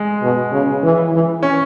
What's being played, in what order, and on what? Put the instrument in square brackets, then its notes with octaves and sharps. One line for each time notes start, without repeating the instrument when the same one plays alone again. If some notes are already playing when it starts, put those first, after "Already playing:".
Already playing: [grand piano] G#3
[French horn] B2
C#3
E3
E3
[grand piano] C#4